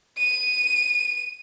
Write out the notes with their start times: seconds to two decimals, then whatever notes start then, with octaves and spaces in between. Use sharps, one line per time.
0.18 D#7